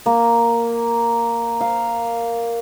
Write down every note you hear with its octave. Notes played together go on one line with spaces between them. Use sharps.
A#3
F5